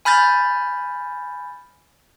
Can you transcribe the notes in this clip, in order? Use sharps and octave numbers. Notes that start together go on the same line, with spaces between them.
G#5 B5 F6 G6 A6